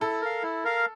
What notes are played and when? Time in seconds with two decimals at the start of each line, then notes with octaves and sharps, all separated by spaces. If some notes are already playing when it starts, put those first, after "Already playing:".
0.01 E4 A4
0.21 A#4 F5
0.43 E4
0.64 A#4 F5